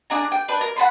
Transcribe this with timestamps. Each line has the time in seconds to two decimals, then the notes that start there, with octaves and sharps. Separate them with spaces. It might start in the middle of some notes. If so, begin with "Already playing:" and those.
0.10 D4 G#4 A#5
0.32 G5
0.48 D4 B4
0.61 A#4
0.76 F#5 A5 B5 C6